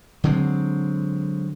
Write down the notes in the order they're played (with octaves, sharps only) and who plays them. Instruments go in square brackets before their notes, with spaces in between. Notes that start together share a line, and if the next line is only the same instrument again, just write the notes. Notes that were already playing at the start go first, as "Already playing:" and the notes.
[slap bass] D3 F#3 G#3 C4